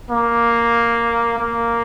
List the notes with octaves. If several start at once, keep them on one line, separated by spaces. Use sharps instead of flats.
A#3
A#3